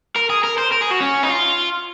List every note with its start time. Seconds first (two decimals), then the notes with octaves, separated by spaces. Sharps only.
0.16 A#4
0.30 G#4
0.44 A#4
0.58 C5
0.72 A#4
0.82 G#4
0.91 F#4
1.00 C#4
1.23 D#4
1.29 F4